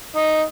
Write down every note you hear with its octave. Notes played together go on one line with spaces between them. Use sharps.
D#4